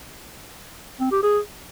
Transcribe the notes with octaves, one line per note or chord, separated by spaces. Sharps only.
C4
G4
G#4